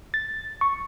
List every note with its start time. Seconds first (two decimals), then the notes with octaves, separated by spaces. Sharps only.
0.14 A6
0.61 C#6